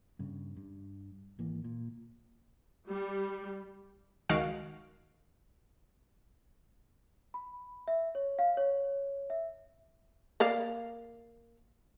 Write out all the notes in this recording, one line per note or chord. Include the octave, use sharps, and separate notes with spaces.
G2 C#3
G2
G#1 E3 A#3
A#2
G3
C#2 D#3 G#3 F#4 F5 D7
B5
E5
C#5
F5
C#5
E5
A#3 D5 F5